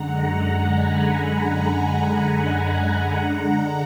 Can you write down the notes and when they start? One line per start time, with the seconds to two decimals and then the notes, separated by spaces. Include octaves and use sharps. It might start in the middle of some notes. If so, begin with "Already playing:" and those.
Already playing: F#2 D3 G#3 F#5 A#5
0.66 G#5 B5
2.32 F#5 A#5
3.16 D3 G#3 D4